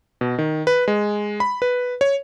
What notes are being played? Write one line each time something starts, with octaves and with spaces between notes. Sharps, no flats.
B2
D#3
B4
G#3
B5
B4
C#5